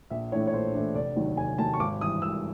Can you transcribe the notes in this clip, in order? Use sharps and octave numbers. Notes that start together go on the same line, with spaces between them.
A#1 E5
A2 E3 A3 D4 C#5
C#5
A#1 C5
A2 E3 A3 D4
F1 D5
D#2 D#3 F#3
F1 G#5
D#2 D#3 F#3 A5
C#6
G#1 D6
G2 E3 D#6
G#1 E6